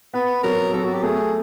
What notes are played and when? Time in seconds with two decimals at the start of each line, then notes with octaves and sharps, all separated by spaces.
0.14 B3 B4
0.44 F#3 A#4
0.73 F#3 A4
0.84 F#4
0.94 G4
1.03 A3 G#4